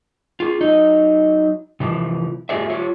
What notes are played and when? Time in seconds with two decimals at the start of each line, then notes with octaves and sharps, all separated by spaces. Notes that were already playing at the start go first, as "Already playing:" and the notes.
0.40 F4 G#4
0.61 F#3 D#4 D#5
1.80 C3 E3 F3
2.49 A3 F4 G4 G#4 C#5 E5
2.70 F4 G4 C#5